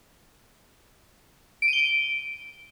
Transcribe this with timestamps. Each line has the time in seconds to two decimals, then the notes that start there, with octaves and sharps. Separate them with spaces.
1.62 D7
1.67 D#7
1.73 G7
1.78 D7